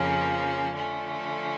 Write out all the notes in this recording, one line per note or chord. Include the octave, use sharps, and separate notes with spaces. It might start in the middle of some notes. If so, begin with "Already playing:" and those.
Already playing: F2 C#3 F3 A#3 C#4
D3 F3 A3 C#4